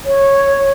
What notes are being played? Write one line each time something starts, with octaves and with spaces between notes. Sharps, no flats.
C#5